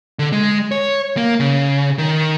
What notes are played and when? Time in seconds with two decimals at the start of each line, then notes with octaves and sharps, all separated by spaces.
0.19 D3
0.33 G#3
0.72 C#5
1.17 A#3
1.40 C#3
1.98 D#3